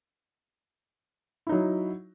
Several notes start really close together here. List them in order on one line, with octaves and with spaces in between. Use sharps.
E4 D#4 F#3